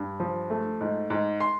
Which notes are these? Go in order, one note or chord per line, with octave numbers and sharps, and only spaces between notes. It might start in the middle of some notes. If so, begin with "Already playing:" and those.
Already playing: G2
F3
A3
G#2
G#2
C6